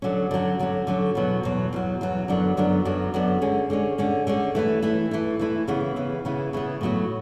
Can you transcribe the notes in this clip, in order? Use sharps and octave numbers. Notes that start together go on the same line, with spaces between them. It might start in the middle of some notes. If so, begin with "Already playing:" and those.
D3 F#3 C#4
D3 F#3 C#4
D3 F#3 C#4
D3 F#3 C#4
E2 B2 F#3
E2 B2 F#3
E2 B2 F#3
E2 B2 F#3
F#2 D3 F#3 B3 D4
F#2 D3 F#3 B3 D4
F#2 D3 F#3 B3 D4
F#2 D3 F#3 B3 D4
D3 G#3 C#4
D3 G#3 C#4
D3 G#3 C#4
D3 G#3 C#4
E3 A3 E4
E3 A3 E4
E3 A3 E4
E3 A3 E4
C#3 E3 B3
C#3 E3 B3
C#3 E3 B3
C#3 E3 B3
A2 F#3 B3 F#4